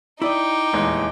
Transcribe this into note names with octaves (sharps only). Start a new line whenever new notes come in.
D#4 E4 D5 D#5 G5 D6
D#1 E2 G#3